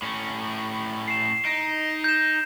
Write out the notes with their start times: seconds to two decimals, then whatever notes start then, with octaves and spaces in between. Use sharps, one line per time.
0.02 A2 C#4
1.08 C7 E7
1.45 D#4 D7
2.04 G6 E7